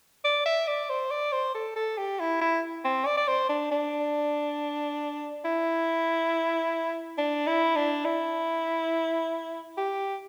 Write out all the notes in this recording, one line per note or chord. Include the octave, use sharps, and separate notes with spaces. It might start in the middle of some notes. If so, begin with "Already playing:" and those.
D5
E5
D5
C5
D5
C5
A4
A4
G4
E4
E4
C4
D5
D5
C5
D4
D4
E4
D4
E4
D4
E4
G4